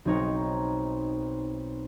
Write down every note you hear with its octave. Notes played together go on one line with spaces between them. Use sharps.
B1 C4 D#4 C#5 A#5